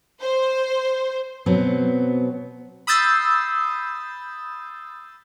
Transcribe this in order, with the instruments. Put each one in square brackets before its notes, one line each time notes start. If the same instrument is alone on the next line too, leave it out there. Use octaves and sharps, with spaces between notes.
[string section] C5
[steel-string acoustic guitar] B2 F#3 B3 C4
[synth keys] B5 D#6 E6 G6 A6 C7